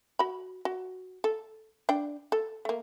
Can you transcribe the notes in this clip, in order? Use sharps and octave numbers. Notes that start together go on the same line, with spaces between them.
F#4 B5
F#4
A4
D4 G5
A4
A3 A#3